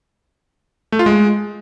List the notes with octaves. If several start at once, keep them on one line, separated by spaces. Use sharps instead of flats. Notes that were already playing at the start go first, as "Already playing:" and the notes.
A3
F4
G#3